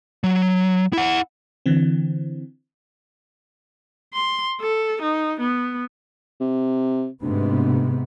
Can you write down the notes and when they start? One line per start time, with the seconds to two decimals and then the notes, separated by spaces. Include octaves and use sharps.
0.24 F#3
0.93 E4 F#5
1.66 D3 E3 C4
4.13 C6
4.61 A4
5.02 D#4
5.40 B3
6.40 C3
7.23 D2 G#2 C3 B3